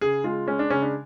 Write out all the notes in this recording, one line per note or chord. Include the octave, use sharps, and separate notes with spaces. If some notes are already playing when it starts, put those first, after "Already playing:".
C#3 G#4
G#3 F4
G#3 C#4
D4
C#3 C#4
D4